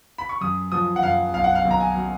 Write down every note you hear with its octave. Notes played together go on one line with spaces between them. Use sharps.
B5
C#6
F#2 D#6
F3 D#6
F#5
F#2 F5
B1 F5
F#5
F5
B1
A#5
G#5
F#3